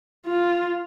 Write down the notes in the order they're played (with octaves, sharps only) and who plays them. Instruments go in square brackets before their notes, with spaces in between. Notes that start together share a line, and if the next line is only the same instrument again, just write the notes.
[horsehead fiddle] F4